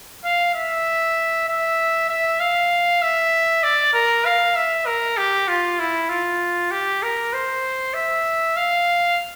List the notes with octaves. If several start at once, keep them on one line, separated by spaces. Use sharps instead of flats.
F5
E5
E5
E5
F5
E5
D5
A#4
F5
E5
A#4
G4
F4
E4
F4
G4
A#4
C5
E5
F5